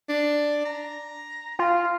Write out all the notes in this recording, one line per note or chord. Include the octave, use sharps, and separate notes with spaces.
D4
A#5
F4